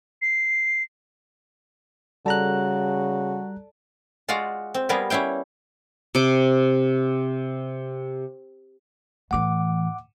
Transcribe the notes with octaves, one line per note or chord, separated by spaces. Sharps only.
C7
C#3 G3 F#4 A4 D5 A5 A#5 F#6
G#3 F4 F#4 D5 F5 F#5
C4
G3 B3 F4 G#4 A#4 B4
G3 C#4 E4 F5 G5
C3 D6
A2 E3 F#5 D6